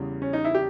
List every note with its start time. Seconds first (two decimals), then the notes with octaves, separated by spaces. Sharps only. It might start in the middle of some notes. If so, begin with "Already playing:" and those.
Already playing: E2 C#3 G3
0.22 C#4
0.33 D#4
0.45 E4
0.55 G4